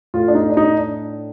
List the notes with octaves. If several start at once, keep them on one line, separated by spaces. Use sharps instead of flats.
A2 A3 F4
D4
D#4
D4
D#4
D4